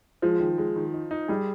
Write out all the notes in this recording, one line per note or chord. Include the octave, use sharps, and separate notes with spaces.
F3 G#3
D#3
G#3
D#3
D#4
D#4
G3 G#4